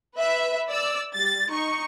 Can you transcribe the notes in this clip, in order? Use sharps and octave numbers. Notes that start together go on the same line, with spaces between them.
B4 E5
D5 E6
G3 A6
D#4 C#6